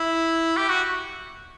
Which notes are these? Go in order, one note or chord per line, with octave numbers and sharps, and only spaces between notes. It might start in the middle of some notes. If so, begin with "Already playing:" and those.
Already playing: E4
G4
F#4